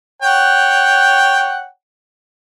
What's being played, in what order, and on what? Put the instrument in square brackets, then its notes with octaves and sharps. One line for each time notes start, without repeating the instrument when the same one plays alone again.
[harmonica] C#5 F#5 G5